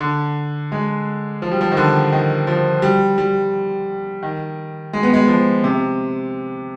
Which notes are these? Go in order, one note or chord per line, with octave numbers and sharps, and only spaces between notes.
D3
G#3
F3
G3
F3
D#3
D3
D#3
F3
G3
G3
D#3
G#3
B3
G#3
F3
C3